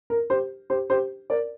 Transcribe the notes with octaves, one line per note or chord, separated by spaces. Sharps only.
A#4
G4 C5
G4 C5
G4 C5
A#4 D5